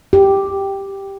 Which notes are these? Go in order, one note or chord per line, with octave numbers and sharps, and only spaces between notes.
G4